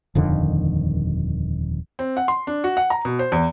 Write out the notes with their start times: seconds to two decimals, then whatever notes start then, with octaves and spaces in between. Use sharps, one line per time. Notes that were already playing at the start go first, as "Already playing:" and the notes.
0.15 D#1 F2 D3 D#3
1.99 C4
2.17 F#5
2.28 C6
2.47 D4
2.64 F#4
2.77 F#5
2.90 A#5
3.05 B2
3.19 C5
3.32 E2